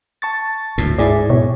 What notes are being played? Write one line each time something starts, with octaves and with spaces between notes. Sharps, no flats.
A5 C#6 A6
D2 A2
G#2 E4 G#4 D5
B2 C#5